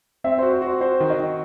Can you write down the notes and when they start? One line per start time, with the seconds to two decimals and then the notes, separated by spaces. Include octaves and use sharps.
0.24 C4 E5
0.38 F#4 C5
0.53 C5
0.62 F#4
0.67 C5
0.81 F#4 C5
1.00 D#3
1.10 D#5
1.20 D#3